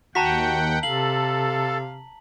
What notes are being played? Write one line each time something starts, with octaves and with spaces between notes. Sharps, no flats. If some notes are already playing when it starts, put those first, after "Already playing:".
D#2 F#4 F#5 G5 A5 A#5 B6
C3 A4 F5 F#7